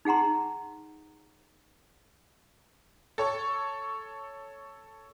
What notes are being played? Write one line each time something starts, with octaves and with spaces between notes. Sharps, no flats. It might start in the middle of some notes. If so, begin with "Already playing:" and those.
D#4 G#4 F#5 A#5 C6
A4 C#5 C#6